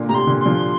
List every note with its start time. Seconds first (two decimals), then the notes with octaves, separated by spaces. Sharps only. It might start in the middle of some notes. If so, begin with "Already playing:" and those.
Already playing: A#2 D3
0.09 A2 C3 A#5
0.15 C6
0.27 A#2 D3
0.40 C6
0.45 D3 F3